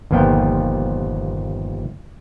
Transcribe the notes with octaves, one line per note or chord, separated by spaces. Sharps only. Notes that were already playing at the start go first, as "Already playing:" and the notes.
G1 D#2 A#2 F3 B3 G5